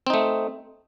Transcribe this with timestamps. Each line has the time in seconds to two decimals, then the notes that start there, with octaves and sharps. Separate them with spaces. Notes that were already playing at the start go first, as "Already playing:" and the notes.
0.07 C4
0.10 D#4
0.14 A3